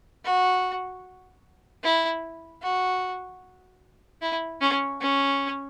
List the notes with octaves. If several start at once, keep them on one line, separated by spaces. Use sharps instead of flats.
F#4
E4
F#4
E4
C#4
C#4